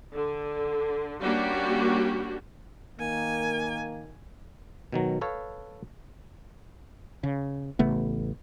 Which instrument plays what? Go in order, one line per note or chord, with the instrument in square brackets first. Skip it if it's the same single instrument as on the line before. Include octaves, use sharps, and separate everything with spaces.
[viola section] D3
G3 A#3 C#4 D4 F#4 G4
[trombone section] D#3 A#3 [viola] G#5
[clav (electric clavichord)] B2 D#3 F#3
A4 B4 C#5 F5
[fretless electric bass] C#3
A1 C#3 A3 B3